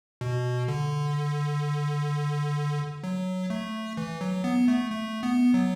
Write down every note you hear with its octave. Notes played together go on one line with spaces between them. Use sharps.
B2
D3
F#3
A3
E3
F#3
B3
A3
A3
B3
F#3